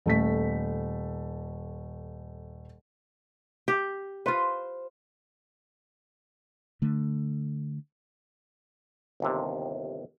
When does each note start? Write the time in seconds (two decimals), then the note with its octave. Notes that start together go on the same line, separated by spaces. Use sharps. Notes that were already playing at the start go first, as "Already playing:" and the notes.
0.06 D#1 A3 B6
3.68 G4
4.26 F4 B4 C5
6.82 D3 A3
9.20 G1 D#2 C3